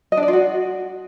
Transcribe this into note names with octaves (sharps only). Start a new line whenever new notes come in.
D#5
D4
D5
F4
F#4